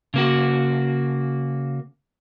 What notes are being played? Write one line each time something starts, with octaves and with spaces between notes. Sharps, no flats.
C#3 A#3 F#4